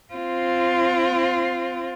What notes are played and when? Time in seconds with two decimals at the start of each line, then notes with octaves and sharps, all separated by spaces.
0.14 C4 F4